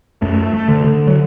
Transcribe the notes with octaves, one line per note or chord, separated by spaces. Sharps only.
F#2 A3
A3
D3
D3
F#3